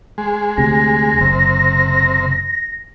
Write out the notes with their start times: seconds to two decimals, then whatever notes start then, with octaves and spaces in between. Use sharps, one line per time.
0.18 G#3
0.58 D2 C3 A#6
1.21 F#1 C3